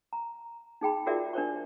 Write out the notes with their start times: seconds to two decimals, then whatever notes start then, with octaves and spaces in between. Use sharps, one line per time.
0.13 A#5
0.81 D#4 G#4 G5 B5
1.06 F4 F#4 G#4 A#4 D5 E5
1.33 D4 A#4 C5 C#6